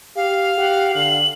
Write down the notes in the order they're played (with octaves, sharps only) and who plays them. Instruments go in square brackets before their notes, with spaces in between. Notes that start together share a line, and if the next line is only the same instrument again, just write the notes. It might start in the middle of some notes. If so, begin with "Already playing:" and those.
[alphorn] G4 [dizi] F5
[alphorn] G4 [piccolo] F#5
[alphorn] D3 [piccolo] F#7